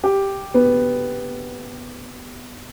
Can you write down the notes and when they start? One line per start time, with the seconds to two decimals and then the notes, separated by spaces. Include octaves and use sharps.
0.04 G4
0.54 B3